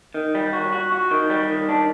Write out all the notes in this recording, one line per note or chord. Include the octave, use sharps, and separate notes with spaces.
D#3
G3
F#4
F#4
F#4
D#3
G3
D#3
D4